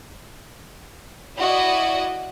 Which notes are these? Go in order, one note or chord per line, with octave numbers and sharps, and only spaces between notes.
E4 F#4 D5 D#5 D#6